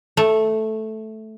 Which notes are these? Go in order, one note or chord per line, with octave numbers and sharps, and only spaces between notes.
A3